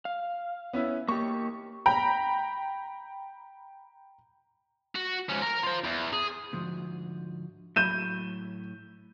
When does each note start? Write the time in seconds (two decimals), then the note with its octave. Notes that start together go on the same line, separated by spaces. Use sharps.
0.05 F5
0.73 B3 C#4 E4
1.08 A#3 G4 C#6
1.86 G5 A#5 B5
4.96 F#4
5.30 G#2 C#4
5.42 A#4 A#5
5.63 F4 C5
5.84 E2
6.13 G#4
6.53 D2 G#2 F3
7.76 A2 F#3 B5 G6 D#7 E7